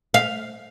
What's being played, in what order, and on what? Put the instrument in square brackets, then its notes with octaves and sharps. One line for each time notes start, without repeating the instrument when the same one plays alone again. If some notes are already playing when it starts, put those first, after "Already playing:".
[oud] F5